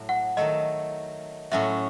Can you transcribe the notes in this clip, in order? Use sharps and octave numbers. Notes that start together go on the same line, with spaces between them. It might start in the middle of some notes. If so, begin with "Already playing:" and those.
Already playing: A2 F#3 A3
F#5
D#3 F#3 A3 D#5
A2 F#3 C#4 F#4 E5